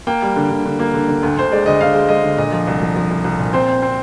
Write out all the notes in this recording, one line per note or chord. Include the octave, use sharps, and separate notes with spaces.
A#3 G5
G3
D3
D3
D3
A#3
D3
D3
D2
D2 C5
G#3 D5
D2 D#5
D2 F5
G#3
G#3 D#5
D3
A#2 D#5
F3
C2
F3
F3
C2
C2
A#2
C4 C5
C4
C4